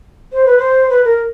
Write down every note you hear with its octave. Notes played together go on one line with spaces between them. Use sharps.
C5
B4
C5
B4
A#4